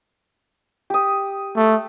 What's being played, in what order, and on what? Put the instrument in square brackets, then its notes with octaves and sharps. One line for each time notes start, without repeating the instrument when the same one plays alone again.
[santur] G4 D#6
[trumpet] A3